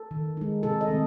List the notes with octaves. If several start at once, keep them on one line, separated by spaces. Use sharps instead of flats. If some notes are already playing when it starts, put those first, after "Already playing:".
Already playing: A4
D#3
G#3 D#4
C3 A4
D#5
D#3 A3 C4